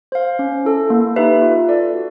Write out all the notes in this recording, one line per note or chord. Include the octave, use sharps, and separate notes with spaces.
C5 F5
C#4
E4 A4
A#3
D#4 G4 B4 E5
F4
A4 D5
F#4